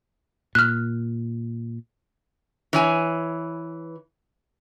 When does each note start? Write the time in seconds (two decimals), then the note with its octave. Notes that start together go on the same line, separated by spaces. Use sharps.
0.55 A#2 F6 F#6
2.73 E3 C#5 G#5